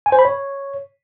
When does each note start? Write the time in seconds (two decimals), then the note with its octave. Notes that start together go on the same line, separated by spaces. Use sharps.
0.06 G#5
0.12 C5
0.19 B5
0.25 C#5